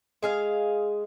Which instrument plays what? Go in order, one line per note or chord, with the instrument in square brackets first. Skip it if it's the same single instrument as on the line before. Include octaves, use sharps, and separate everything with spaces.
[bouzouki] G#3 G#4 F5